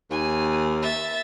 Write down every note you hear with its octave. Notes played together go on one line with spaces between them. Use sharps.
D#2 G#5
E5 A6